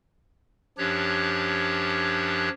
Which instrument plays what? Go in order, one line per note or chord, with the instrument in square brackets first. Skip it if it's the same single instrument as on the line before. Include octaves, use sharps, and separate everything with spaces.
[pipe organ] F#2 F3 D4 G4 C#5 F#6